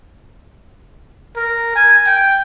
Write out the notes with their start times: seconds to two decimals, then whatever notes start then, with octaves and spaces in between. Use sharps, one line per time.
1.36 A#4
1.75 G#5
2.07 G5